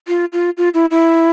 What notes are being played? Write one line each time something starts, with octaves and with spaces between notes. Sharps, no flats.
F4
F4
F4
E4
E4